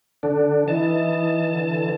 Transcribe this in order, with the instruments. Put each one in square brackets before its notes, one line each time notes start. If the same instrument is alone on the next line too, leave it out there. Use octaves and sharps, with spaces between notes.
[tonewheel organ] D3 D4
[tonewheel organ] E3 A5 [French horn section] D#4 E4 D#5
[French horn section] D3